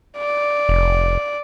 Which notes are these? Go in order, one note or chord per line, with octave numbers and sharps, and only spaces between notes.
D5
F1